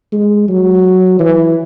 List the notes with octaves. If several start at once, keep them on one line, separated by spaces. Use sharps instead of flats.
G#3
F#3
E3